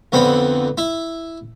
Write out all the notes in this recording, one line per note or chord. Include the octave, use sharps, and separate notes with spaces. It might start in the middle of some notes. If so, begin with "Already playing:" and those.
F2 D3 B3 C4 B5
E4 E5